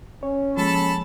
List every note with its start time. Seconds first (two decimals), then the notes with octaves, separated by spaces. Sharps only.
0.23 C#4 C#5
0.57 F3 G#3 A#3 A4 A5 B5